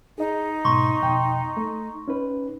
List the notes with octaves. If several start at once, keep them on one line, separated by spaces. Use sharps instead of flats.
D#4 G#4 D#5
G#2 B2 C6 C#6
F2 B2 G5
A3
C#4 D#4 B4